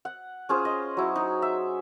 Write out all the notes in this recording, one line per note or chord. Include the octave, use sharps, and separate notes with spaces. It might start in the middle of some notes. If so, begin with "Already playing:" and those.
F#5
C#4 F4 G#4 C5
D#5
F#3 E4
D#4
E5